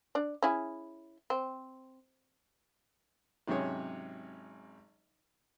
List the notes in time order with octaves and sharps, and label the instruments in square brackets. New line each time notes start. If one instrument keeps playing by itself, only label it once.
[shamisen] D4 D5
C#4 E4 G#4
C4
[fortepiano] G#1 C3 F#3 C#4 G#4 C#5